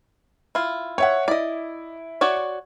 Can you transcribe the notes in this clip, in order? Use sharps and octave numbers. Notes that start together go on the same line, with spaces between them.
E4 F4
C#5 E5 F#5
E4 D5 D#5
F#4 C#5 D5